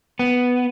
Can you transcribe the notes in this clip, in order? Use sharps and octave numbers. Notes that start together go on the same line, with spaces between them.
B3